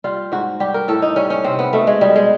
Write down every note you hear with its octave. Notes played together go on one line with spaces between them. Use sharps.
G3 F4
G#2 F#4
G3 G4
A#4
A2 A4
D#4
G3 C#4
C#4
C3 C4
B3
B2 A3
G#3
B2 G3
G#3